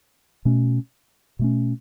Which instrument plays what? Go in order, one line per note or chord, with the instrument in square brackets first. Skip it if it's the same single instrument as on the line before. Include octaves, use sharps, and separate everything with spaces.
[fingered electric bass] B2 A3 C#4
B2 A3 C#4